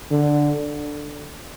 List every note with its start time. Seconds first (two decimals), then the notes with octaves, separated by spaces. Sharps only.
0.11 D3